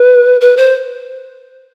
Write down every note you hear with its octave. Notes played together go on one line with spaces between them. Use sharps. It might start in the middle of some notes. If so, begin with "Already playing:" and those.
Already playing: B4
B4
C5